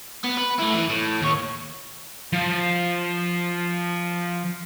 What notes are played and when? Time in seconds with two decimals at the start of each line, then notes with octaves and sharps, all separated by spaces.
0.24 B3
0.37 B4
0.59 A3 E4
0.74 E3
0.89 A2
1.22 D#2 C#5
2.33 F3 F5